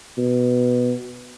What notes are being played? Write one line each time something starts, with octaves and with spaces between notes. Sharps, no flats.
B2